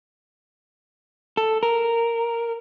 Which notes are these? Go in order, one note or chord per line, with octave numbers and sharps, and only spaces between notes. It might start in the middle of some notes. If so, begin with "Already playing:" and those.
A4
A#4